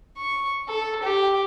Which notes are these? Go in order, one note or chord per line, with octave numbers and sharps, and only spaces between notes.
C#6
A4
G4